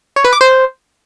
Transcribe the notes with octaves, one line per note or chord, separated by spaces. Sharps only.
C#5
B4
D6
C5